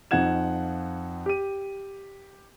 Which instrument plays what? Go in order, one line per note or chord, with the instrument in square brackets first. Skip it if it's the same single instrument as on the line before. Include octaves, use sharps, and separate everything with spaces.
[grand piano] F2 F3 D#4 F#5 G#6 E7
G4 D#7